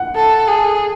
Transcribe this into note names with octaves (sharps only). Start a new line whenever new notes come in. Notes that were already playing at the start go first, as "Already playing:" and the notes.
Already playing: F#5
A4
G#4